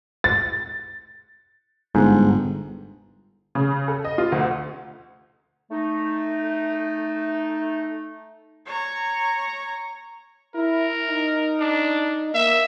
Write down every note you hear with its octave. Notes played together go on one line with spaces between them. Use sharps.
A6
G1 G#2
C#3
A4
D#5
F4
D2
A3 D#4
C#5 A#5
E4 A#4
D#4
D4
A#3 E5